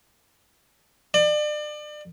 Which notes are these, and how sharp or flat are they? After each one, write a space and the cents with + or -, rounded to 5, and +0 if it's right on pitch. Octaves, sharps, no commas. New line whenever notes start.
D5 +35